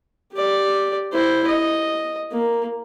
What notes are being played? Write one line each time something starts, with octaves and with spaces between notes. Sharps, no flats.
G4 D5
E4 C5
D#5
A#3